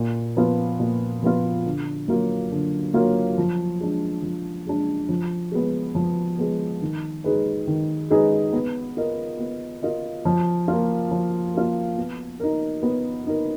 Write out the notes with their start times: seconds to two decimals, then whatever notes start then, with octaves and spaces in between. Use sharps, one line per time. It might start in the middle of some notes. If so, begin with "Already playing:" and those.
Already playing: A#2
0.37 F3 B3 F4
0.80 A#2
1.23 F3 B3 F4
1.66 D3
2.08 F#3 A#3 F4
2.52 D3
2.94 F#3 A#3 F4
3.38 F3
3.81 G#3 D4
4.23 F3
4.67 G#3 D4
5.09 F3
5.52 G#3 B3
5.95 F3
6.39 G#3 B3
6.82 D#3
7.24 G#3 D#4 G#4 B4
7.67 D#3
8.10 G#3 D#4 G#4 B4
8.53 B3
8.97 F4 A#4 D#5
9.39 B3
9.83 F4 A#4 D#5
10.25 F3
10.68 A#3 F4
11.11 F3
11.54 A#3 F4
11.98 B3
12.40 D#4 A#4
12.83 B3
13.27 D#4 A#4